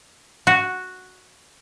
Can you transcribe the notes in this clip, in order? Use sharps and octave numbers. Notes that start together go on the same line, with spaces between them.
F#4